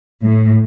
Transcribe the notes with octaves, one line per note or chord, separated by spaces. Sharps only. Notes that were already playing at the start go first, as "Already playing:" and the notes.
A2